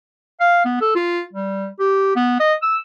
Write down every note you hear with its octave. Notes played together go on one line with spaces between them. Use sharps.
F5
B3
A4
F4
G3
G4
B3
D#5
E6